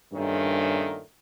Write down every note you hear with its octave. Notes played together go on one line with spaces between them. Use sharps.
G2 A#2 D#3 A3 C#4